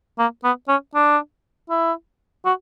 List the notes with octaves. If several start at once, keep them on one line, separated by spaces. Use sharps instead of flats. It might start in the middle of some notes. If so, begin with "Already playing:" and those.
A#3
B3
C#4
D4
E4
F#4